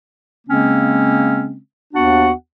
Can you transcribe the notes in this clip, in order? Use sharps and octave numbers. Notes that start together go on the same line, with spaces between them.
C#3 G#3 A#3 C4 C#4
D#2 B3 D4 F#4 F#5